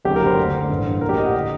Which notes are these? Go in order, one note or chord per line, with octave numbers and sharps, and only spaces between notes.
F#1 F#2 D3 G4
A#4
C5
D2 D3
A1 G2 D3
A#1 A2 A#4
G4
D#5
F#5
D3 D#5